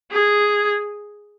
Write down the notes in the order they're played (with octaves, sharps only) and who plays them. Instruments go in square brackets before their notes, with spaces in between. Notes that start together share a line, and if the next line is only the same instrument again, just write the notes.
[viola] G#4